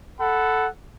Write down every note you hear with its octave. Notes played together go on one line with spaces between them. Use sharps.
A4 F#5 B5